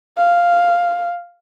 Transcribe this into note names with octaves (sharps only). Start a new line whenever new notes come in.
F5